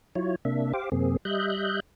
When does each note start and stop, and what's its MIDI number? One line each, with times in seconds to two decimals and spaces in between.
0.16 0.35 54
0.16 0.35 64
0.16 0.35 65
0.16 0.35 73
0.45 0.73 48
0.45 0.73 58
0.45 0.73 62
0.45 0.73 76
0.73 0.89 67
0.73 0.89 72
0.73 0.89 77
0.73 0.89 86
0.92 1.17 42
0.92 1.17 48
0.92 1.17 58
0.92 1.17 60
0.92 1.17 68
1.25 1.80 55
1.25 1.80 75
1.25 1.80 76
1.25 1.80 90
1.25 1.80 91